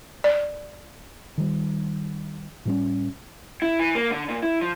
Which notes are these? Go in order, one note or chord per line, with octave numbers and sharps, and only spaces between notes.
D5
D#3 G3
A2 G3 C#4
E4
E3
A#3
D3
A#2
E4
F3